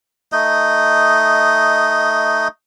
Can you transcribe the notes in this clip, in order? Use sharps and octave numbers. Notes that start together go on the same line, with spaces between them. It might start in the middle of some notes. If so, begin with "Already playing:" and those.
A3 D#4 D#5